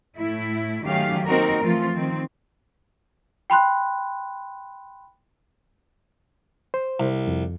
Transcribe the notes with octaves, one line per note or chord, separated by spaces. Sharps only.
A2 A3 E4
D#3 F#3 A3 C#4 G4 F5
A#3 C4 D#4 F#4 A#4
E3 F3 A3 C4 F4
D#3 C4
G5 B5 C6 F#6
C5
C2
F2